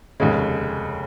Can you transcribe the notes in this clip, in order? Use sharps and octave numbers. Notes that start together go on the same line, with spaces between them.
F1 D#2 C#3 G#3